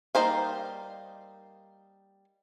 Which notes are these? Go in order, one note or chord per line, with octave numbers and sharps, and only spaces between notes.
G3 A#3 D#4 C5 F5